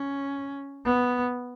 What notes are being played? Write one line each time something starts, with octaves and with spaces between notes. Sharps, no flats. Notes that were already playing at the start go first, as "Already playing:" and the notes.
Already playing: C#4
B3